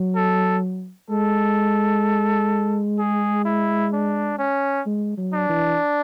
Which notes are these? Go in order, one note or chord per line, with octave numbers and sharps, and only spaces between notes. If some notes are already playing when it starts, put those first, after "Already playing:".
Already playing: F#3
A4
G#3 A4
G#4
E4
D4
C#4
G#3
F#3
D4
E3